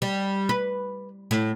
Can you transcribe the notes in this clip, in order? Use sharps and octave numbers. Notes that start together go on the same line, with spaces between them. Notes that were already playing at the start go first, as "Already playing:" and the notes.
G3
B4
A2